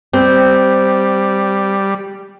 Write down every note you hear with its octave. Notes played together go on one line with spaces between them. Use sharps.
G3 C4